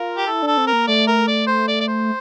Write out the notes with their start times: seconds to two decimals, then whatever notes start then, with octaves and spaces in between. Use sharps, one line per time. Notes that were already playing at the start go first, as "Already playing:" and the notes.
Already playing: F4 A#4
0.17 G4
0.27 E4 A4
0.42 D4 A4
0.57 C4
0.67 A#4
0.73 A#3
0.88 A3 D5
1.07 A#4
1.28 D5
1.47 C5
1.68 D5
1.80 D5
1.88 C5